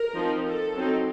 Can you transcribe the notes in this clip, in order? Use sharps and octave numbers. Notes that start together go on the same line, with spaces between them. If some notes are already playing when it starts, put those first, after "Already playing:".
Already playing: A#4
F3 C4 D#4
A4
F#3 C4 D#4